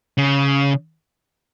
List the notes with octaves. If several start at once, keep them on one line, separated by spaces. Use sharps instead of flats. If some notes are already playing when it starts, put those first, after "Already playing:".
C#3